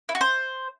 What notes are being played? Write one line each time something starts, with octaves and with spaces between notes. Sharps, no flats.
E4
F#4
C5